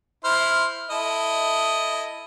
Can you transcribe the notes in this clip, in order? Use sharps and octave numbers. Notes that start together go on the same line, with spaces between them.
E4 C5 F6
E4 A4 D#5